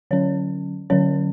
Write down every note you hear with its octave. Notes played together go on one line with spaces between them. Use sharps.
D3 F#3 C#4 C#5
D3 F#3 C#4 C#5